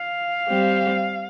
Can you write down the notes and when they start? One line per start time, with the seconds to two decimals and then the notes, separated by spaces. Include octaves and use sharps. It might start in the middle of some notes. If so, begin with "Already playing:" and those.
Already playing: F5
0.47 G3 C4 G4